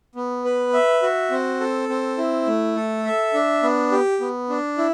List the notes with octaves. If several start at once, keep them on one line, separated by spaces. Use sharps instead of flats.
B3
B4
E5
F#4
C4
A4
C4
E4
A3
A4
E5
D4
B3
G4
B3
D4
E4